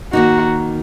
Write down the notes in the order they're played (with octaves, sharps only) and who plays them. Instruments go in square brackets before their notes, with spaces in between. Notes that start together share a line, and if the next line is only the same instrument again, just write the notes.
[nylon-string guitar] D#3 A#3 D#4 [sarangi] F#4